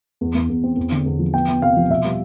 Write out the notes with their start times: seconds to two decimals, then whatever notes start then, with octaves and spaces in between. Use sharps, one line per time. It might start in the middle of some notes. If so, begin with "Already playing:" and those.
0.21 E2
0.34 E2
0.49 E2
0.64 C4
0.77 E2
0.92 D3
1.06 E2
1.19 F3
1.34 B3 G5
1.49 B3
1.62 C3 F5
1.77 F3
1.90 B2 E5
2.05 G3